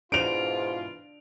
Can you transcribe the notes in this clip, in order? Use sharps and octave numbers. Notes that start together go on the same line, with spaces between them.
G#2 B2 E3 D4 F4 D7 F7